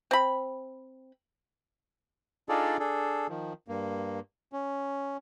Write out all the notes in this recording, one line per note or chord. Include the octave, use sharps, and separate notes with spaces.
C4 B5
D4 D#4 F4 G#4 A4 D5
D4 G#4 A4
D#3 F3
G2 A#3
C#4